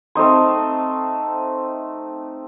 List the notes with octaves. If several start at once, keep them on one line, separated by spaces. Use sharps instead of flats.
A3 C4 D#4 C6